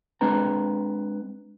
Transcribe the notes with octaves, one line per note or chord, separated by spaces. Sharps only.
G#3 C4 D4 B4 A#5